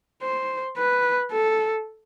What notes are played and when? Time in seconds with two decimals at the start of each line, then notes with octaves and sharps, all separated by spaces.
0.22 C5
0.77 B4
1.31 A4